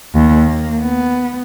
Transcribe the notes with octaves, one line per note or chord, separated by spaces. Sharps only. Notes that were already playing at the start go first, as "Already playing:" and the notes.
D#2
A#3
B3